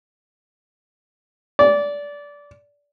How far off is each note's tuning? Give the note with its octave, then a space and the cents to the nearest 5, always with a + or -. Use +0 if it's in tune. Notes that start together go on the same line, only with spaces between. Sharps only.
D5 -20